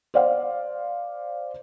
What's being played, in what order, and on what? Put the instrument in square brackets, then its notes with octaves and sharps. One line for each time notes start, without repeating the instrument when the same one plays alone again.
[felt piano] C5 D5 F5